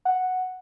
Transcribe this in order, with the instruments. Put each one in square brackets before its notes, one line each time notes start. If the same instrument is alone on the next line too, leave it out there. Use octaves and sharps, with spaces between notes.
[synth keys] F#5